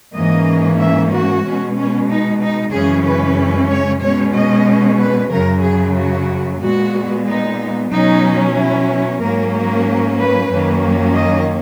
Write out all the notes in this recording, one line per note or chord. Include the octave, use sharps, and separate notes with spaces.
G#2 E3 A#3 C#4 D#5
E5
F#4
B2 G#3 C#4
C#4
D#4
D#4
F#2 C#3 E3 G#3 C#4 G#4
B4
C#5
B2 G#3 C#4 C#5
D#5
B4
F#2 C#3 F#3 A#4
G#4
F#4
A#2 G#3 B3 F#4
D#4
B2 F#3 C#4 D#4
E4
G#2 F#3 A#3 C#4 A#4
A#4
B4
F#2 D#3 F#3 A#3 C#4
D#5